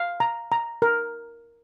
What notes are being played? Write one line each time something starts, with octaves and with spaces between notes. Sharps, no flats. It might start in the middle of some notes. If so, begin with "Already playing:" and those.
Already playing: F5
A#5
A#5
A#4